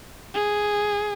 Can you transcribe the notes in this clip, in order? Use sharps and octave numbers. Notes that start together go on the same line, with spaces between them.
G#4